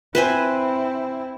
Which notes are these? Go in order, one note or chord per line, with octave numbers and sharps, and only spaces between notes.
C4 E4 B4 C5 G#5